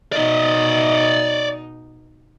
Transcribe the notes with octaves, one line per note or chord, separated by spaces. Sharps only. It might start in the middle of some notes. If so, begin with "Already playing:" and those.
B2 D#4 D5 D#5